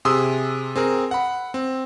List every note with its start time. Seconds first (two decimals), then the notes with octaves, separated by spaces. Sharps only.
0.05 C3 G#4 C6 D#6 E6
0.76 C4 G#4 A#4
1.11 F#5 B5
1.54 C4